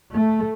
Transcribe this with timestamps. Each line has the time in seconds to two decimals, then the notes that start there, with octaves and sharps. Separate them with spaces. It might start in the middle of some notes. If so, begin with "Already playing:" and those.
0.14 A3